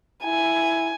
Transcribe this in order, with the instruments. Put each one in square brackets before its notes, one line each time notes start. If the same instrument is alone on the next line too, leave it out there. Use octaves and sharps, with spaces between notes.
[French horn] E4 [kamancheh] G#5